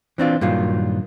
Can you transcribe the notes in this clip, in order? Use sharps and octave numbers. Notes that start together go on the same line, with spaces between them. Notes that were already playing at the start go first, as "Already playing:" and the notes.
E3 C4 D4 F4
G2 A#2 D#3 F#3 F4